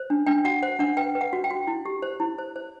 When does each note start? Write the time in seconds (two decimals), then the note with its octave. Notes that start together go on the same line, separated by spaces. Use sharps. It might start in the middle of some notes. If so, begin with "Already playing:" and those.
Already playing: C5
0.10 D4
0.26 D4 G5
0.45 F#4 F#5
0.63 C5 F#5
0.79 D4 F#5
0.97 B4 G5
1.15 B4
1.21 F#5
1.33 F#4
1.44 G5
1.51 F#4
1.67 E4
1.85 G4
2.02 C5
2.20 E4
2.39 C5
2.56 C5